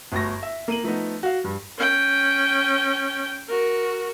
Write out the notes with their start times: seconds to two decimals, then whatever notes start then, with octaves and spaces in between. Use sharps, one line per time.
0.12 G1 D2 C#6 A#6
0.43 E5
0.68 A#3 D#7 F#7
0.83 F3 A3 B3 D#4
1.23 F#4 F5
1.44 G2
1.78 C#4 G5
3.48 F#4 A#4